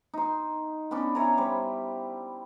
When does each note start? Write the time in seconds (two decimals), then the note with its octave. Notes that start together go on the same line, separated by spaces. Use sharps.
0.14 D#4 C6
0.91 B3 C#4 D4
1.15 E4 C#5 G#5 A#5
1.38 G3 G4 C5